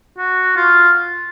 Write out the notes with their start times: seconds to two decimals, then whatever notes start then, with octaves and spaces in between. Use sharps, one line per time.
0.18 F#4
0.56 F4